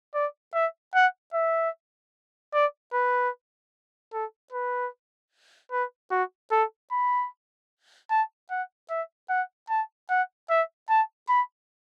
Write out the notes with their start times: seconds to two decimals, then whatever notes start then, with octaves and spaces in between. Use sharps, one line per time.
0.14 D5
0.54 E5
0.95 F#5
1.34 E5
2.54 D5
2.93 B4
4.13 A4
4.52 B4
5.72 B4
6.11 F#4
6.51 A4
6.92 B5
8.10 A5
8.51 F#5
8.90 E5
9.30 F#5
9.70 A5
10.10 F#5
10.50 E5
10.89 A5
11.29 B5